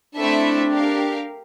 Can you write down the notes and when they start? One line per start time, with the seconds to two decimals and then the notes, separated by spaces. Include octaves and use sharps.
0.16 A3 C4 D4 E4 A4 E5
0.71 G4 A#4 F5